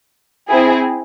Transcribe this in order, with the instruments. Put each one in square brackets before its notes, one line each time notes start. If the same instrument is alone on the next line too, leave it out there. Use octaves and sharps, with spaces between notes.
[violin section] C4 E4 G#4